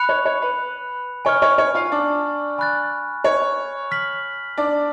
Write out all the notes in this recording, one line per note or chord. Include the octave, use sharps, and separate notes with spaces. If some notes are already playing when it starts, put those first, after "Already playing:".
Already playing: B5 F#6 C#7 F7
C#5
C#5
B4
C#5 G#5 C#6 F6
C#5
C#5
F4 F5
D4 D5
G#5 B5 F#6 A6
C#5
F6 B6 F#7
D4 D5